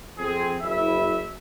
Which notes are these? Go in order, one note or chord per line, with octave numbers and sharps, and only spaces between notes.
F2 C4 G#4
F#1 E4 E5